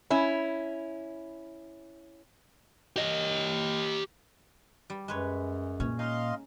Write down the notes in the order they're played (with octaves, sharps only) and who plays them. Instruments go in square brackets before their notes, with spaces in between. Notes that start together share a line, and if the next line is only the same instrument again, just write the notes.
[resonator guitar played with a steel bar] C#4 E4
[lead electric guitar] G4 D#5
[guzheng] G3
[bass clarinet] F#2 [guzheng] G#3 B4 C#5
[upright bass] A#2 [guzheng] C#4
[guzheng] D#4 [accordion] D#5 F5 C6